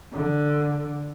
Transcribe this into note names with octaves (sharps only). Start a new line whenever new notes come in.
D3